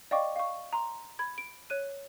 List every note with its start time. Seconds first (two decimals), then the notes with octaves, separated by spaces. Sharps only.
0.11 D5 D#5 F5 G5 C#6 D6
0.36 F5 C#6
0.73 A#5 C6
1.19 B5 G#6
1.38 D7
1.70 C#5 F#6 D#7